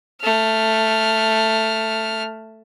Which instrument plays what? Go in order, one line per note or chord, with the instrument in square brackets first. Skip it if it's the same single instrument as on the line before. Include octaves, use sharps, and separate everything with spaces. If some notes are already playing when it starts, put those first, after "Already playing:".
[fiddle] A3 F6